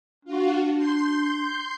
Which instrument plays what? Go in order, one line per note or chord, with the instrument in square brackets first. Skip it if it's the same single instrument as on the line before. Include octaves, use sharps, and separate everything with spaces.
[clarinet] D4 [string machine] F4 F#4
[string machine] C6 G6